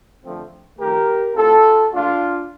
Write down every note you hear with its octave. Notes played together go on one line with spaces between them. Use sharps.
F2 D3 F3 A3 C4
F2 D#3 A3 G4 A#4
A2 A3 C4 F4 A4
A#1 A2 A3 D4 F4